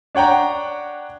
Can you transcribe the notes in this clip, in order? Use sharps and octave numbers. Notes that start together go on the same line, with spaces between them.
D4 C#5 F#5 G5 A#5